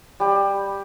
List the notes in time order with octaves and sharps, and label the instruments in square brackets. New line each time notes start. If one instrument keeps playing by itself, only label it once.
[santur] G3 G4